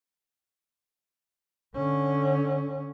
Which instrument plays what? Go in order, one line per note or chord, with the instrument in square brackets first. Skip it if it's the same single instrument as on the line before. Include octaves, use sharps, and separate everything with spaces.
[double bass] D3 C#4